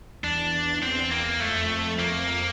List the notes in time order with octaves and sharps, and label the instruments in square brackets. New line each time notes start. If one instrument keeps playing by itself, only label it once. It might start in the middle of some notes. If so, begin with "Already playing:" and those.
[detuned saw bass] E2 [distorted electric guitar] D4
[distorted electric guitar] C4
A#3
[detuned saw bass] F2 [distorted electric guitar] A3
[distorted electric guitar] A#3